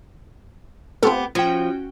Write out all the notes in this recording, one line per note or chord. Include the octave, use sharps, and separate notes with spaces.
B3 C4 F4 G4 A4
F3 C#4 F#4 G5 G#6